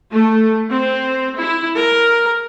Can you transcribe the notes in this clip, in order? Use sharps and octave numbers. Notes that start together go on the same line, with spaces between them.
A3
C4
E4
A#4